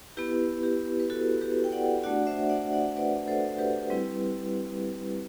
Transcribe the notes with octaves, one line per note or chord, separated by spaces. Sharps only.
B3 E4 G4 B4
G4
B4
F#4 A4
G4 B4
G5
D5 F#5
A3 D4 F#4 D5 F#5
C5 E5
D5 F#5
D5 F#5
B4 D5
A4 C5
G4 B4
G3 C4 E4